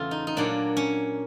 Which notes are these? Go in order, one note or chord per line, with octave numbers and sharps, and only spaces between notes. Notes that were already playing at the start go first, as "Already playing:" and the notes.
Already playing: E2 C#3 E3 A3 F4
D#4
D#4
A#2 F#3 A#3 C#4 D4
C#4